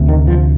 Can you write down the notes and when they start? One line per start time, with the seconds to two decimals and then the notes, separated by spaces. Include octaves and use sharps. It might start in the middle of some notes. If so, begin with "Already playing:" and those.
Already playing: D2 C3
0.09 D#3
0.27 F3